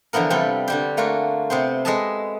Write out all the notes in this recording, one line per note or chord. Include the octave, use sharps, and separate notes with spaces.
D3 E3 F3 B3 A#4
C3 G3 B3 F4 A4
D3 G3 G4
A3 A#3 F4 F#4
C3 B3 C4 C5
G#3 A4 B4 D#5 E5 A5